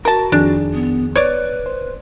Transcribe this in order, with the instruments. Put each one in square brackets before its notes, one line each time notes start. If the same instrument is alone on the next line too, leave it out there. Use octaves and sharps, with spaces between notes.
[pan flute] F#4 [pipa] A#4 A5
[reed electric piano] F2 D#3 G#4 [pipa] D4
[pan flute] B3
[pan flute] B4 [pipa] C#5 D5
[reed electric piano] C5